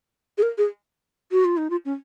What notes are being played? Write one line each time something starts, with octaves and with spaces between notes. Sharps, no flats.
G#4
A#4
G#4
F#4
F4
D#4
F4
C#4